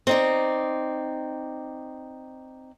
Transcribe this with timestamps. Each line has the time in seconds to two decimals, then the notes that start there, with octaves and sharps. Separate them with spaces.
0.07 C4 D#4 D5